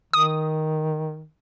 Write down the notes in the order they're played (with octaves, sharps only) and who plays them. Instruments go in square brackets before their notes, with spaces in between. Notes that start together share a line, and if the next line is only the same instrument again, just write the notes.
[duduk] D#3 [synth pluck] D#6